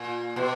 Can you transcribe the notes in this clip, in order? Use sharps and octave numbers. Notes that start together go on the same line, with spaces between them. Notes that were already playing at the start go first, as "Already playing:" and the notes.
Already playing: A#2
B2